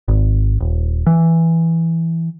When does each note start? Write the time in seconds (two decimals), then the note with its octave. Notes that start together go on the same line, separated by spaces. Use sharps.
0.08 G#1
0.61 D#1
1.07 E3